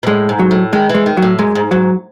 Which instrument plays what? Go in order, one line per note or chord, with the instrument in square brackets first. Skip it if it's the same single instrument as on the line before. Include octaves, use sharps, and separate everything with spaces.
[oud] B2
[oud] A2 [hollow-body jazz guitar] G#3
[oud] G#2
[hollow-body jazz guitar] F#3
[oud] A2
[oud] D#3 [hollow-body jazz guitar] G#3
[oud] E3 [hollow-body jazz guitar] G#3
[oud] D#3
[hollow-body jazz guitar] F#3
[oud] A2
[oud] F#2 [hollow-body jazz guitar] G#3
[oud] G#2
[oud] G#2 [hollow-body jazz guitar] F#3